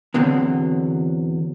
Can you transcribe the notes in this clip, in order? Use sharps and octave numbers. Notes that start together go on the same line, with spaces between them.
E2 B2 D3 F#3 C4